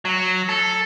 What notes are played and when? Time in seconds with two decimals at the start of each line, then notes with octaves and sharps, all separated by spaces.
0.05 F#3
0.49 A4